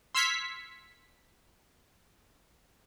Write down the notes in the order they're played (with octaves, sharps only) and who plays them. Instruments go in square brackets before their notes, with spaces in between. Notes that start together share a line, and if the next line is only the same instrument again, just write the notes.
[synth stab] C6 E6 F6 G#6 B6 C#7